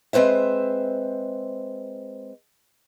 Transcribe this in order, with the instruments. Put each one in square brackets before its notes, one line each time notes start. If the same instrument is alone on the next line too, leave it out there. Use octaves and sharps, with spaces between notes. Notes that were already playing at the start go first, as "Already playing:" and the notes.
[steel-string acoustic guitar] G#3 C4 B4 C5 E5